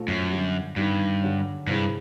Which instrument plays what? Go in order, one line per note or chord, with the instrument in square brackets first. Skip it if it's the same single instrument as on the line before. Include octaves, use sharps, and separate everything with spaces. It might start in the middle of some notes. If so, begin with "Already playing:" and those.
Already playing: [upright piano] A#1 A#2 F3 A3
[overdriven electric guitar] F#2
[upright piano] D3 G3 B3
[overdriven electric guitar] G2 [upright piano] D#3 G3 B3
[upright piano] F#2 D3 G3
[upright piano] C2 C3 E3 G#3 [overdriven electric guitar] G2